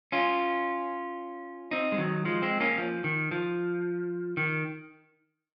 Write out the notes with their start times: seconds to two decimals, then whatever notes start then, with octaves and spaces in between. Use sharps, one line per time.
0.12 C#4 F4
1.71 C4 D#4
1.92 G#3
1.98 D#3 F#3
2.25 F3 G#3
2.42 G#3 C4
2.60 A#3 C#4
2.78 F3
3.04 D#3
3.31 F3
4.37 D#3